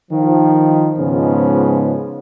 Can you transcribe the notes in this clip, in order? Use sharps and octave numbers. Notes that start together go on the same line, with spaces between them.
D#3 F3
G#2 C#3 F3 G#3 B3 F4